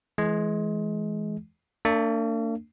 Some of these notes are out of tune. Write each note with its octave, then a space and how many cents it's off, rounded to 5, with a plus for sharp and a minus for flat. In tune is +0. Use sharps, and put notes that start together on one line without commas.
E3 +5 G#3 +25
A#3 -45 D4 +0